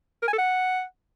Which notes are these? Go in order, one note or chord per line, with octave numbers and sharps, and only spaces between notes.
A#4
G#5
A4
F#5